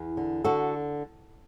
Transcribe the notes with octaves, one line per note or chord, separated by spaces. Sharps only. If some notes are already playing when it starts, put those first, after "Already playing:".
Already playing: E2
D3
D3 F#4 A4